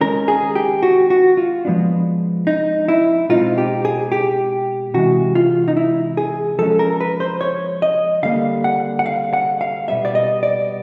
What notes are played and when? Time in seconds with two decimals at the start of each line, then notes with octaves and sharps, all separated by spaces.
0.01 D#3 G#3 C#4 A#4
0.28 G#4
0.55 G4
0.83 F#4
1.10 F#4
1.37 F4
1.65 F3 G#3 B3 D4
2.47 D#4
2.88 E4
3.29 B2 G#3 C4 D#4 F4
3.58 G4
3.85 G#4
4.12 G4
4.94 C3 E3 G#3 F#4
5.35 F4
5.68 D#4
5.77 E4
6.17 G#4
6.59 F3 G#3 C#4 A4
6.79 A#4
7.00 B4
7.20 C5
7.41 C#5
7.82 D#5
8.23 D3 G3 A#3 F5
8.64 F#5
8.99 F#5
9.06 F5
9.33 F#5
9.61 F5
9.88 B2 G3 B3 E5
10.05 D5
10.15 D#5
10.43 D5